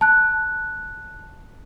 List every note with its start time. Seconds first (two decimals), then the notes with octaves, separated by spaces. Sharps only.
0.01 A5 F#6